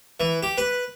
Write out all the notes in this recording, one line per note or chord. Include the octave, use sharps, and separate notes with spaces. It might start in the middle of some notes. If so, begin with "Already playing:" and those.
E3
G4
B4